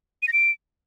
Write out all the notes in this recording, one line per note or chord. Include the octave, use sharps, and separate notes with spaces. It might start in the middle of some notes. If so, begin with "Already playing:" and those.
D#7
A#6
D7